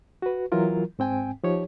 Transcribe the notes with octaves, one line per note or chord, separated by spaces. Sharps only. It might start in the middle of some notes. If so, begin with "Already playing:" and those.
F#4 B4
E3 F#3 E4 F4 A#4
G#2 C4 G5 G#5
F3 D#4 G4 C#5